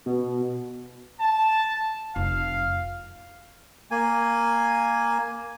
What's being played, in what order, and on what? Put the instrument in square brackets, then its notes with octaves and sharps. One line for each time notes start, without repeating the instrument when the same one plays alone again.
[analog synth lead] B2
[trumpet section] A5
[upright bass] F1 [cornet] F5
[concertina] A#3 G#5